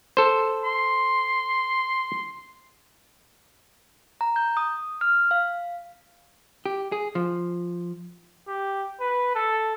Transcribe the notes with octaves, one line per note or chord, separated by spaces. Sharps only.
A4 C5
C6
A#5
G6
D#6
F6
F5
G4
G#4
F3
G4
B4
A4